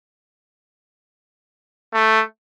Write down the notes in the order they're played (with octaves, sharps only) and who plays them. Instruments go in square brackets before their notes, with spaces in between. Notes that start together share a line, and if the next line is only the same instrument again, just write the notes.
[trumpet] A3